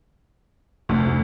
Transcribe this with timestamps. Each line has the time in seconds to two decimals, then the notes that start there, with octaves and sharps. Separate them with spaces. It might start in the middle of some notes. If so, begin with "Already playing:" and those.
0.89 F1 D2